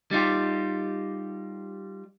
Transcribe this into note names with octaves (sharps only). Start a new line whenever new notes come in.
G3 D#4 F4 G4